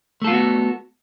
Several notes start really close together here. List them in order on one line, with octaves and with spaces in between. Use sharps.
A3 A4 F4 B3 F#4